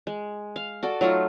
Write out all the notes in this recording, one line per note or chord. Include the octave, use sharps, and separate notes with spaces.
G#3
F5
F#4 A4 D5
F#3 A3 D#4 F4